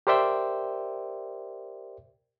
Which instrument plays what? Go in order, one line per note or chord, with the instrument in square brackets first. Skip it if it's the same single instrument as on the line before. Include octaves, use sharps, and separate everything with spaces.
[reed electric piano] G4 A#4 C5 D5 E5 G5